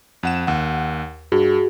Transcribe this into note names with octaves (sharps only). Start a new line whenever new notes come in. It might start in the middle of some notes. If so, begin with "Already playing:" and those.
F2 F#5 E7
D#2 F#5
G2 F#4 G#4